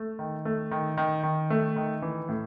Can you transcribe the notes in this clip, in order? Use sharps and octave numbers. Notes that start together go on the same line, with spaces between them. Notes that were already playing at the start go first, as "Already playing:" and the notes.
Already playing: A3
D#3
A3
D#3
D#3
D#3
A3
D#3
E3
A2